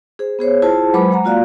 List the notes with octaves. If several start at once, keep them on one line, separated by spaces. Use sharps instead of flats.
G#4 C5
B3 G#4 C5 C#5
E4 F4 G#4 C5 A5
F#3 G#3 B4 C5 B5 D6
G#3 F#5 A#5
A#3 F4 F#4 D5 F5